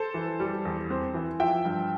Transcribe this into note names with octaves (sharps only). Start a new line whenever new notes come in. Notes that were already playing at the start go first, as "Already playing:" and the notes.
Already playing: A4 C5
E3
G3
E2
C4
E3
F3 E5 G5
G2